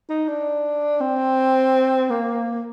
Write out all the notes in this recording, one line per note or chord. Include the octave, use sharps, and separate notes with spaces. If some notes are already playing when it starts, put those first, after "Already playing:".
D#4
D4
C4
A#3